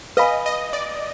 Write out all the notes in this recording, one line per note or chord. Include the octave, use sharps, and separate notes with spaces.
B4 D#5 F5 G#5 B5
D#5
D5